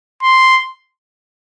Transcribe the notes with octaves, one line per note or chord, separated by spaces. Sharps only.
C6